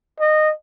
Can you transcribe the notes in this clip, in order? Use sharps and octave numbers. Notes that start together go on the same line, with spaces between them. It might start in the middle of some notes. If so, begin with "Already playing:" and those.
D#5